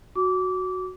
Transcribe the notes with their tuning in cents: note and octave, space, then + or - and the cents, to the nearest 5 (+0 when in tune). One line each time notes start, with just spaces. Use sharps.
F#4 +0 D6 -20